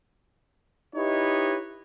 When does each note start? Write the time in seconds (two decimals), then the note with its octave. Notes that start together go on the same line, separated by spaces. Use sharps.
0.96 D#4 E4 G4 B4 C#5 D#5